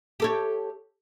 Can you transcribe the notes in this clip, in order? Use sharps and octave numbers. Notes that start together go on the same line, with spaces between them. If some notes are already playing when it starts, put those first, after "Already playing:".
G4 A4 C#5